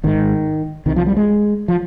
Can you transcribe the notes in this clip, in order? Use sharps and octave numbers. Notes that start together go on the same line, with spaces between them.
G#1 G#2 D#3
C2 C3 D#3
F3
G3
G#3
F3